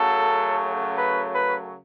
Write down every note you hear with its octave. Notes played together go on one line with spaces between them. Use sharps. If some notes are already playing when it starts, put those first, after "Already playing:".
Already playing: F#2 C#3 F#3 A3 A4
B4
B4